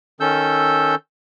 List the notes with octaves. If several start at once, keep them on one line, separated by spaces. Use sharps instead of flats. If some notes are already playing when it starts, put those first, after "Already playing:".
D#3 C#4 A4 E6 G6